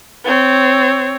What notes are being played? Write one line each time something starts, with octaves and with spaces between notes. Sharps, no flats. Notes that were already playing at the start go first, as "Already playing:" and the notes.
C4 C#5